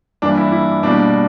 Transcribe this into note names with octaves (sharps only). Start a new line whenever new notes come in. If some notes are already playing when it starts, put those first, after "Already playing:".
G2 E3 A#3 D4
E4
E4
B2 G3 A#3 D4